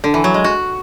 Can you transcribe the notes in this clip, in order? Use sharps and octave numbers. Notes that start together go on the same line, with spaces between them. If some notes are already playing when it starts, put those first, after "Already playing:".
D3
E3
F#3
G#3
F#4